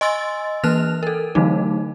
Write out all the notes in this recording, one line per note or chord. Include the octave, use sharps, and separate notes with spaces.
D#5 G#5 C6 E6 A6
E3 A#3 B4 F6 F#6 F7
A4 A#4
D3 E3 F#3 A3 D#4